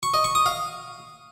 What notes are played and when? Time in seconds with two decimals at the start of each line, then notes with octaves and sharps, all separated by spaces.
0.03 C#6
0.14 D#5
0.24 C#6
0.35 D#6
0.46 F5